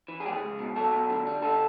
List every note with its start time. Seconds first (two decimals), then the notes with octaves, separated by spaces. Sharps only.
0.08 E3
0.20 G#4
0.25 F2 G4
0.32 G#4
0.42 C#2
0.59 B2
0.76 F#3 A4
0.93 B2
1.10 D3
1.27 G3
1.42 D3 A4